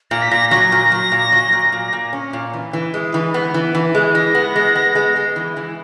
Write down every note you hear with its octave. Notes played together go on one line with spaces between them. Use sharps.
A#2 A#6
B6
A#2 A#6
F#3 A#6
A#2
F#3
A#2
F#3
A#2
A#2
A#2
C#4
A#2
E3
E3
G#3
E3
B3
E3
E3
G#3
E3 A#6
B3
G#3
B3
G#3
G#3
E3
E3